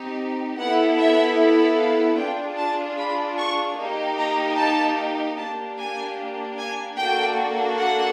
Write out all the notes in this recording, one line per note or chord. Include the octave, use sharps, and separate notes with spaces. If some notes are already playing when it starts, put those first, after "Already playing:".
Already playing: C4 D#4 G4
B3 E4 A4 F#5
E5
F5
D4 F4 G#4 G5
A5
B5
C#6
A#3 D#4 G4
A#5
A5
A#3 D4 G4 A5
G#5
G#5
A#3 D4 F#4 A4 G5
F#5